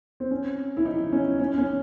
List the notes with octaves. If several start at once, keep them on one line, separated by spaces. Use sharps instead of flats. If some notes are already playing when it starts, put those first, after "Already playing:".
C4
C#4
E4
D#4
C#4
C#4
C#4